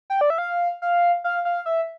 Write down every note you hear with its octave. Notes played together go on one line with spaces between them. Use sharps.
G5
D5
E5
F5
F5
F5
F5
E5